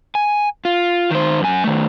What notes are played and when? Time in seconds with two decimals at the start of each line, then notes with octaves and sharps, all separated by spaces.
0.15 G#5
0.65 F4
1.10 D#3 C5
1.41 F#2 G#5
1.64 D#3 A3